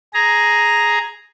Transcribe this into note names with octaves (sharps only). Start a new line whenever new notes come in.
G#4 A#5